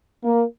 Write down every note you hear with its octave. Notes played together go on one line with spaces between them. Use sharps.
A#3